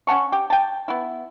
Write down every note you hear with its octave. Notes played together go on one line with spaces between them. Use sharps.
C#4 F#5 A5 C#6
G4
G5 A5
B3 E4